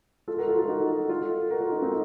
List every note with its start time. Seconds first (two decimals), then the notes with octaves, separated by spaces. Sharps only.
0.28 F4 A4
0.38 F#4 A#4
0.48 F4 A4
0.58 F4 A4
0.68 D#4 F#4
1.09 F4 A4
1.50 F#4 A#4
1.61 F4 A4
1.72 D#4 F#4
1.82 C4 D#4